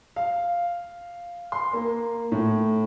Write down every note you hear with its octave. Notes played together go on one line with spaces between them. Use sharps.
F5
C6
A#3
A2